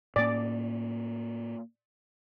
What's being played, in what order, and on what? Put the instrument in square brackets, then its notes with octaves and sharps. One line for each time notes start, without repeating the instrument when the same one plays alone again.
[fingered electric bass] A2 A#3 C#4 [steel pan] D5